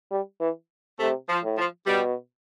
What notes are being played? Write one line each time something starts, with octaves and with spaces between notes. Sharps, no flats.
G3
E3
C3 A3
F3
A2
F3
B2 G3